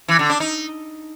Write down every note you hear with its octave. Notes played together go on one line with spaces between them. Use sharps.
E3
D3
D4
D#4